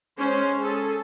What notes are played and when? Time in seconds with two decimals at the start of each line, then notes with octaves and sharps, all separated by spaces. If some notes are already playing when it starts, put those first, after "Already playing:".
0.19 G#3 C#4 C5
0.58 G#4 A4